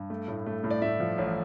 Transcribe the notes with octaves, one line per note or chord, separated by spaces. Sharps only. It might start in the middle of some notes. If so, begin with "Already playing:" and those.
Already playing: G2
A3
A2
A3
A2
D5
A2 E5
F3
A1